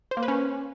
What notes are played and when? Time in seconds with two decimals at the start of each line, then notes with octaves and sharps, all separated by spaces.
0.11 C5
0.17 A#3
0.23 B4
0.28 C#4